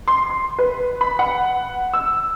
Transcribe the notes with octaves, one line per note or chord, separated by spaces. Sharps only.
C6
C6
B4
B5
F#5
E6